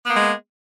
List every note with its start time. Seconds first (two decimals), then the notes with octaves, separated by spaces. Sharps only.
0.06 B3
0.10 A#3
0.14 G#3